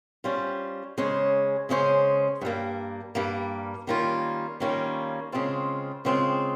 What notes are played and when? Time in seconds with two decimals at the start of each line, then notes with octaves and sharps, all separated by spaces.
0.24 G3 C#4 F4 C5
0.98 C#3 G#3 C#4 G#4 C5
1.69 C#3 G#3 C#4 G#4 C5
2.41 G2 G3 A#3
3.15 G2 G3 A#3
3.87 D#3 G3 A#3 C#4 F4
4.60 D#3 G3 A#3 C#4 F4
5.32 C#3 G#3 C4 F4
6.05 C#3 G#3 C4 F4